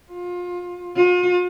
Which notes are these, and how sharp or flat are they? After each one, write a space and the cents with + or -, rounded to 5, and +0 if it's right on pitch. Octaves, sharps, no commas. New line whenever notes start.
F4 +25
F4 +45